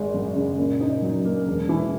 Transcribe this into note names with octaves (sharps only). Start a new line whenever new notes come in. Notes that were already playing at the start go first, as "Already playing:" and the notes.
Already playing: G#1 G#3
F#2
C#3
A#2
D#4
F#3
A#3
E1
E3